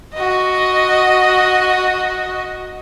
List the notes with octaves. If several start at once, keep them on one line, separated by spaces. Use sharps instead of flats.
F#4 D#5